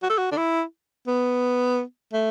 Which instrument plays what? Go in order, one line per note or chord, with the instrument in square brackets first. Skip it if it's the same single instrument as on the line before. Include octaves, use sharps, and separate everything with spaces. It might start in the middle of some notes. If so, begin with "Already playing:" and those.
[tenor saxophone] F#4
A4
F#4
D4
E4
B3
A3